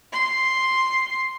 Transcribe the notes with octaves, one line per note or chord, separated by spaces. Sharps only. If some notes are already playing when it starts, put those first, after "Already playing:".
C6